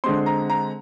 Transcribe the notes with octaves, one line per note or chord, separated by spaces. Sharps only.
D3 G#3 C4 C6
A#5
A#5